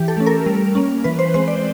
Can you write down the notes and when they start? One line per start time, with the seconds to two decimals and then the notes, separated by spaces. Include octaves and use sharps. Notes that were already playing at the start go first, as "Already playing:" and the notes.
Already playing: E3 G4
0.08 A4
0.17 A3 C#4
0.26 A#4
0.46 G3
0.75 A#3 C#4
1.04 E3 B4
1.19 C5
1.34 G#3 C4 C5
1.48 D5